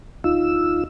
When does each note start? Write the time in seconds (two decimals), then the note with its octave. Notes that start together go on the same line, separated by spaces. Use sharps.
0.24 D2 D#4 F4 E6